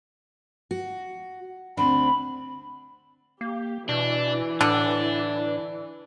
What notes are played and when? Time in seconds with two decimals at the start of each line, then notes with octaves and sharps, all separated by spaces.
0.71 F#4
1.77 D2 C4 D4 B5
3.41 A#3 G4
3.89 B2 E3 D4
4.61 A2 D3 D4